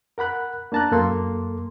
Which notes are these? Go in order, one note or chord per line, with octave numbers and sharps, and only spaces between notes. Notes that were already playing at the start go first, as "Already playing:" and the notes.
A#4 F#5 B5 F#6
A#3 D4 A5 A#5 F#6
F#2 A#3 A4 C6